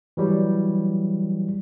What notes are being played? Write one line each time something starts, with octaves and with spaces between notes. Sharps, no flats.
E3 F#3 G3